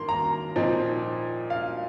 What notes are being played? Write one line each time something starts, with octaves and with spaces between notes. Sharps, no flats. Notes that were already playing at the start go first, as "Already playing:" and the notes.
Already playing: D#3 A#3 C6
A#5
A#2 F3 C4 D#4
F5